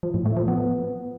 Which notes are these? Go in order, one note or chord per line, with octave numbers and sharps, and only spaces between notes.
F3
A2
A3
F3
B3